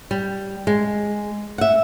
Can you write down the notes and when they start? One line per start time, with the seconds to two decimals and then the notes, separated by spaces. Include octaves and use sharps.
0.11 G3
0.67 G#3
1.58 E5 F#5